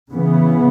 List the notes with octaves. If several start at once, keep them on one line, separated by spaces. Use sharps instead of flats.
C#3 E3 B3